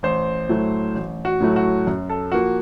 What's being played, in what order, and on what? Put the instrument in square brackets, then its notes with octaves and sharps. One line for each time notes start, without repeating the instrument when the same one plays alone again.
[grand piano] A1 C5
A2 F#3 A3
A1
F#4
A2 F#3 A3
F#4
F#2
A4
F3 A#3 F#4